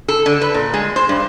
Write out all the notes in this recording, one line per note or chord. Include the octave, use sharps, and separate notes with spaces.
A4
D3
B4
A#2
G#3
C5
G2